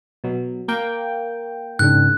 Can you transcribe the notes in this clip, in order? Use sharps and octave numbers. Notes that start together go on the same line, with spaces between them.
B2 F#3
A#3 G5
G#2 C#3 D4 F#6